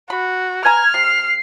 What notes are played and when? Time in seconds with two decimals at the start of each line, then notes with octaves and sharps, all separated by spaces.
0.10 F#4 B5
0.65 B4 G#5 A#5 F6 G#6
0.94 C3 C7